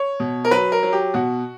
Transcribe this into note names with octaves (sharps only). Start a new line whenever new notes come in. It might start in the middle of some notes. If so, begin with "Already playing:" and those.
Already playing: C#5
B2
A#4
F#3 B4
A#4
F#3
G4
B2 F#4